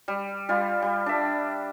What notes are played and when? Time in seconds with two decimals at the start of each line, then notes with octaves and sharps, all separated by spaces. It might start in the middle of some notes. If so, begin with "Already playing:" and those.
0.08 G3
0.49 G3 F4
0.82 G3
1.06 D4 E5